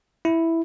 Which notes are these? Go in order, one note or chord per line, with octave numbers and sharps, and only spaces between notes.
E4